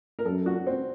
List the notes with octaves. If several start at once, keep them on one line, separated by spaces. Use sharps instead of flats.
A#4
F#2 A4
F#4
C4